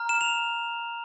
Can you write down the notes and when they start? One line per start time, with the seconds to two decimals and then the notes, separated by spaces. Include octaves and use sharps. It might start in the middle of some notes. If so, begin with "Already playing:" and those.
Already playing: A#5 F6
0.09 E7
0.21 F7